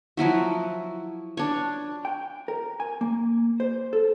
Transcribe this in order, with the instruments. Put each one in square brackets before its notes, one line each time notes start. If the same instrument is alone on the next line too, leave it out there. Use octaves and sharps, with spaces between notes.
[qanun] F3 F#3 E4 F#4
D4 C#5
[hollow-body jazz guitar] G5
A#4
G#5
A#3
C5
A4